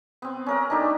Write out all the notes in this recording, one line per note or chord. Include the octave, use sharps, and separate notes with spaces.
B3 C4
C#4 A#4 F#5
D4 D#4 G4 A4